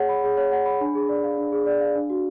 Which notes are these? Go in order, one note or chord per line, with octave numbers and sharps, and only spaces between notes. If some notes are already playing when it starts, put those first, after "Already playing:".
Already playing: G#4 C#5 F#5
B5
G#4
C#5
F#5
B5
D4
G#4
D5
F5
D4
G#4
D5
F5
D4
F#4